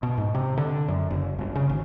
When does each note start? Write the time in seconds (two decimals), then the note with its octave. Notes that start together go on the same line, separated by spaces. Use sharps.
0.03 B2
0.18 G#2
0.35 C3
0.57 D3
0.88 F#2
1.10 F#1
1.39 G1
1.55 C#3
1.69 G#1